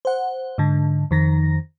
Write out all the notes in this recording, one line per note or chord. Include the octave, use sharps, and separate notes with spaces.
C5 F#5
G#2 D3
F2 D#3 A#6